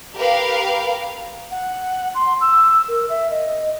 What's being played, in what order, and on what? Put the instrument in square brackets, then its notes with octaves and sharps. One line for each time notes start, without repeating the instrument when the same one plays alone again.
[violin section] G4 A#4 B4 F5
[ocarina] F#5
C6
E6
A#4
E5
D#5